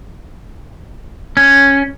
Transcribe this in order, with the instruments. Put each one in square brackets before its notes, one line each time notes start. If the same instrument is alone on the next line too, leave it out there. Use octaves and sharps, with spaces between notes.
[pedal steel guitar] C#4